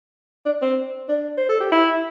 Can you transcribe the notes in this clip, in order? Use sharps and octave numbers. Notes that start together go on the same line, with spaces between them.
D4
C4
D4
C5
A4
G4
E4